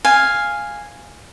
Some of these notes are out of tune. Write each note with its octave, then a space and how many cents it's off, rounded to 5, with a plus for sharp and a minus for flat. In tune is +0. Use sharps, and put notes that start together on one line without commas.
F5 +0 G#5 -5